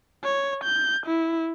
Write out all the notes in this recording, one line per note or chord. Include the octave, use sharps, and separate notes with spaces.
C#5
G6
E4